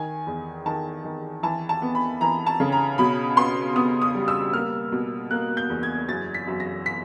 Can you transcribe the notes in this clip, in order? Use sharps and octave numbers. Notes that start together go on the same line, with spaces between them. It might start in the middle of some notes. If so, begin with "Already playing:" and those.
Already playing: D#3 G#5
E2
D#3 A5
D#3
E3 A5
A5
B3
B5
E3 A#5
A5
C#3
A#5
B2 B5
B3 C6
B3 D#6
D#6
G3
E6
A#3 F6
B2
A#3 F#6
G6
E2
G#6
F#2 A6
B6
F#2
A#6
B6